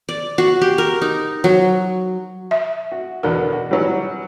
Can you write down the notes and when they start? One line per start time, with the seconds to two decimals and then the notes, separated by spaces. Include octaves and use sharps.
0.09 D5
0.38 F#4
0.62 G4
0.78 A#4
1.02 D#4
1.44 F#3
2.51 E5
2.92 F#4
3.23 E2 B2 D3 A#4
3.53 F#4
3.71 E3 F#3 G3